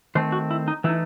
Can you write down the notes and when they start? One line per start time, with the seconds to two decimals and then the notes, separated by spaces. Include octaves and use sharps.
0.15 D#3 A3 C4 C5
0.32 F#4
0.51 E4
0.68 D#4
0.84 E3 A3 D#4 E4